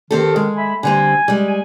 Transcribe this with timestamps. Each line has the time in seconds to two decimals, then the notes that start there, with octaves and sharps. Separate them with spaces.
0.11 D#3 C4 G4 A4
0.36 G#3
0.56 E5 G#5 B5
0.83 D3 G3 C4 G#5
1.28 G3 G#3
1.46 G#5